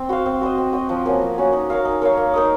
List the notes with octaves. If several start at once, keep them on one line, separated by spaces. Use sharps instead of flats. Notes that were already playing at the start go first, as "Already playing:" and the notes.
Already playing: C4
F#4 C5 F5
C4
F#4 C5 D#5
C4
F#4 C5 D#5
F3
A#3 C#4 F#4
F3
A#3 C#4 F#4
D#4
A#4 C#5 F5
D#4
A#4 C#5 F5
A#3
D#4 A#4 D#5